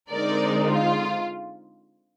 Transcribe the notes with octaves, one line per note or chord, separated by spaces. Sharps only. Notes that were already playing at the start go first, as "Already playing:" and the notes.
D3 G#3 C4 D#4 A#4 D5
F4